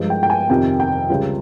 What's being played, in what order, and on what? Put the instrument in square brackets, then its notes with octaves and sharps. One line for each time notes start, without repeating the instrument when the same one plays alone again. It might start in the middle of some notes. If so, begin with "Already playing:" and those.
Already playing: [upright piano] G2 F3 G#3
G5
G5
G#5
F2 C3 D#3 G5
G5
C#2 C#3 G3